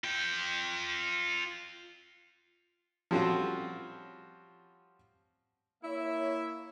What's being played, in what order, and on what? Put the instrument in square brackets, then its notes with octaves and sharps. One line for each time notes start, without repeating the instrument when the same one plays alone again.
[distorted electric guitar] F4 G5
[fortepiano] F3 G3 C4 C#4 F4 F#4
[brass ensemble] A#3 C#5 E5 [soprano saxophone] E4